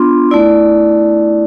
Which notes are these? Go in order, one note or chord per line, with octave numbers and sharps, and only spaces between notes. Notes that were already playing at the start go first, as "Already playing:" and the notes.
Already playing: B3 D4 F4 C6
A3 E4 D5